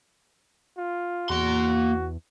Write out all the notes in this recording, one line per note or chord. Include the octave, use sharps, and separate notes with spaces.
F4
E2 A#3 F#4 C6